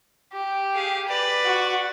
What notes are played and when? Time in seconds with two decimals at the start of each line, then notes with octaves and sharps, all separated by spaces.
0.33 G4
0.74 G#4 F5
1.08 B4 D5
1.45 F#4